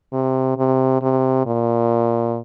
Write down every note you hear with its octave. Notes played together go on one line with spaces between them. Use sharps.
C3
C3
C3
A#2